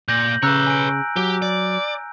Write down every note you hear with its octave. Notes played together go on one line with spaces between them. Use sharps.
A#2 G6 A#6 F#7
C#3 B4 C#5 A#5 E6 F#6
G#5 D7
F#3 G4
D5